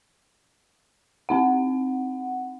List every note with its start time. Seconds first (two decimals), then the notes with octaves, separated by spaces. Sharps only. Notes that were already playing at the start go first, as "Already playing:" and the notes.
1.29 C4 D#4 F#5